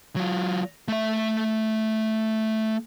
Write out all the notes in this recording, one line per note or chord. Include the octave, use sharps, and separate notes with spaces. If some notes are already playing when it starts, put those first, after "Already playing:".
F#3 F4
A3 E5